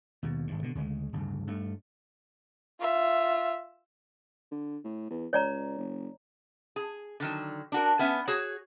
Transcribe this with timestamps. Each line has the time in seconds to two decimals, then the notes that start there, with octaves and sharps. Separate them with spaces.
0.23 D#2 B2
0.47 G#1 G2
0.62 B2 D3
0.75 D2 C#3 G3 G#3
1.13 D1 G2 C#3
1.47 G2 A3
2.80 F4 E5
4.51 D3
4.84 A2
5.10 E2
5.33 C#2 C#5 D5 A#5
5.78 F#1
6.76 G#4
7.20 D3 D#3 F#3
7.72 D4 F#4 A#4
7.99 B3 C#4 E5 G#5
8.27 F#4 G#4 C#5